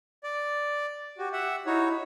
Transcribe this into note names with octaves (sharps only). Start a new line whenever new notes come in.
D5
F#4 G4
E5 F#5
D#4 E4 F#4 C#5